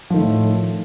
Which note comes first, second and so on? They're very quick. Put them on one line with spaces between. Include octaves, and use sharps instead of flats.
F3 D#3 A3 A2